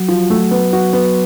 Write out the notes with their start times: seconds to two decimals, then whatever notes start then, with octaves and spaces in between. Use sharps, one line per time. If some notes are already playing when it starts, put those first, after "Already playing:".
Already playing: F#3
0.08 F3
0.30 A3
0.51 B3
0.73 F#4
0.93 B3